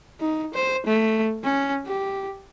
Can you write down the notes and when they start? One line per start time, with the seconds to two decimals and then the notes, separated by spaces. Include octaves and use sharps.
0.21 D#4
0.54 C5
0.87 A3
1.43 C#4
1.86 G4